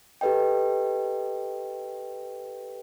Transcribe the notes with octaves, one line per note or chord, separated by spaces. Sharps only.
G4 A4 B4 D#5 G5